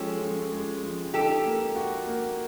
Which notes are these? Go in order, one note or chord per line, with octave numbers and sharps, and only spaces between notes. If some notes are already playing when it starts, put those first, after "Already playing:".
Already playing: F3 G#3 C#4 G4 A4
F3
G#3
F3
D#4 G4 A4
A#3
F#4
A#3